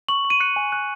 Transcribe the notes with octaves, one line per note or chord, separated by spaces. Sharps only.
C#6 F#7
C#6
D#7
F#6 C#7
G#5
F#6